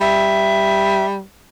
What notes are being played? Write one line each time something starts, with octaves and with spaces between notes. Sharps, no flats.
G3 E5